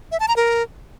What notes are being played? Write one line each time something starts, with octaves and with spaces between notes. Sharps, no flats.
E5
A5
A#5
A#4